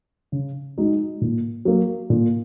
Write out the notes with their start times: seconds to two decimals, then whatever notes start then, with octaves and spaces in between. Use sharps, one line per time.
0.32 C#3
0.78 G#3 D#4 F#4
1.21 A#2
1.65 F#3 A#3
2.10 A#2